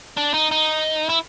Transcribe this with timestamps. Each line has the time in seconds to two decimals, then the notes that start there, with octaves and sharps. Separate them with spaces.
0.17 D4
0.34 D#4
0.51 D#4
1.09 E4